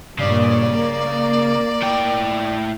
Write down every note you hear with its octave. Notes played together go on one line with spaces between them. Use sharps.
G2 A#2 C#3 D5
A#3
A2 G5